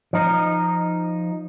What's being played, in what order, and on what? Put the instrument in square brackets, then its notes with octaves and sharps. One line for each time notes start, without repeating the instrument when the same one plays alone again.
[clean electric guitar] F3 D#4